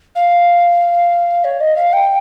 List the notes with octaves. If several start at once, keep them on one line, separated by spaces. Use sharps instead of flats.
F5
C#5
D#5
F5
G5